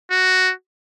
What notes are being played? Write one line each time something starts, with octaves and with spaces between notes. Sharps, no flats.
F#4